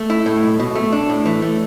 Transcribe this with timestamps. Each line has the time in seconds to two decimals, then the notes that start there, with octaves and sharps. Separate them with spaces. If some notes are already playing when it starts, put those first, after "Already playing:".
Already playing: A3
0.10 E4
0.26 A2
0.43 B1
0.59 B2
0.75 A3
0.92 D4
1.10 A2
1.26 E3
1.42 A3